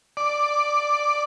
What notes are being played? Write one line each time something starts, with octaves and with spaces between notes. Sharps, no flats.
D5